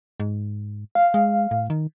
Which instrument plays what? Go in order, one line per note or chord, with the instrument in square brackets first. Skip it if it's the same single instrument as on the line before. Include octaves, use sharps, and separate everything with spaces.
[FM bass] G#2
[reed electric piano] F5
[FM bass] G#3
A2
D#3